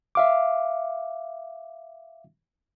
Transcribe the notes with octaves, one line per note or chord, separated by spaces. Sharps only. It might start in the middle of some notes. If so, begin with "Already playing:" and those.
E5 F5 D6